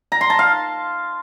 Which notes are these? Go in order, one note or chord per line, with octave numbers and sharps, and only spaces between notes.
A#5
C6
A5
F5